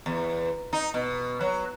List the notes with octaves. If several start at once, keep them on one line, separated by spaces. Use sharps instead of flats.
E2
D#4
B2
F#3